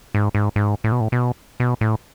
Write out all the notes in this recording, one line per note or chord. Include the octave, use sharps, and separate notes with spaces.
G#2
G#2
G#2
A2
B2
A2
B2
B2
A2